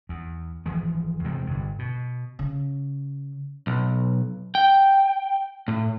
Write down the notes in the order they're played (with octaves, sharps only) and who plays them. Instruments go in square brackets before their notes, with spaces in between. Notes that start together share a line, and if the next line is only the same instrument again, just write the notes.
[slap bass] E2
G#1 E3 F3 G#3
E2 C3 G#3 C4
G1 G2
B2
[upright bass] C#3
[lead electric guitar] B1
G5
A2